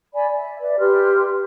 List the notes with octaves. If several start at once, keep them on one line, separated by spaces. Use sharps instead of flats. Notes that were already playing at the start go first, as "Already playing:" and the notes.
D5 G#5 B5
E5
B4 D5 E5
G4 B4 C6 F6